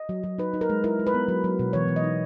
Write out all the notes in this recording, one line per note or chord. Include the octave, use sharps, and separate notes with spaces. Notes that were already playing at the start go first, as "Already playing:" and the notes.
Already playing: D#5
F#3
F#3
D#4 B4
D#4
A#4
G#3
E4 A#4
G#3
B4
B3
F#3
F#3
B2
E3 C#5
E3
D#5
D#4